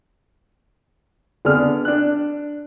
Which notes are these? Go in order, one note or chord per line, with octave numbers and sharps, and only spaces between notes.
D3 B3 D4 G#4 F6
D4 F#6